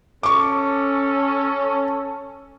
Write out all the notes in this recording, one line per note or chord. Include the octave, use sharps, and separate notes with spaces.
C#4 A4 C#6 D6